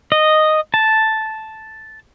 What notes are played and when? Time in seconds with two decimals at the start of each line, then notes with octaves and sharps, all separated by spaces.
0.12 D#5
0.74 A5